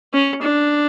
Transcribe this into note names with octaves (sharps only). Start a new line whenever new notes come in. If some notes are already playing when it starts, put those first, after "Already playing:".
C#4
D4